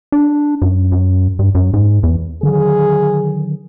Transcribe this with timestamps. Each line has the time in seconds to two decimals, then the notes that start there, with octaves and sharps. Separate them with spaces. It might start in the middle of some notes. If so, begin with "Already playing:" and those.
0.12 D4
0.62 F#2
0.92 F#2
1.39 G2
1.55 F#2
1.74 G#2
2.03 E2
2.43 D3 D#3 F#3 G#4